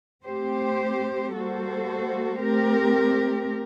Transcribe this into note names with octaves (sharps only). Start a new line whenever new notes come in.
A3 C4 G4 C5
G3 A#3 F#4 A4 C5
A3 C4 G4 A#4